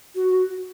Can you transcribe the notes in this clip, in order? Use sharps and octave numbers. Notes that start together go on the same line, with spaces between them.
F#4